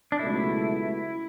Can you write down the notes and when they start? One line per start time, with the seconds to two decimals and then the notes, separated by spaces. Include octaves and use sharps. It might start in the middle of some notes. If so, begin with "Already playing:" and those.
0.12 D4
0.19 C#2 B2 F#3 A3 E4